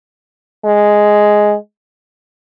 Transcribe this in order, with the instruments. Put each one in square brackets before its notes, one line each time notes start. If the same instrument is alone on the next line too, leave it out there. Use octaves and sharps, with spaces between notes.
[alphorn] G#3